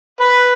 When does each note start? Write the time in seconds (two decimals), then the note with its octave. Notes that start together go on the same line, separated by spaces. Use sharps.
0.20 B4